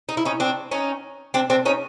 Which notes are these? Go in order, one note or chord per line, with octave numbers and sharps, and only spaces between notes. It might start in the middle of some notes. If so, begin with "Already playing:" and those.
D#4
E4
C#4 D#4
C4 D4
C#4 D#4
C4 D4
C4 D4
C#4 D#4